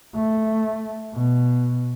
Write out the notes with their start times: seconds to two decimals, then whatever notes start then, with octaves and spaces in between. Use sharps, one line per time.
0.16 A3
1.14 B2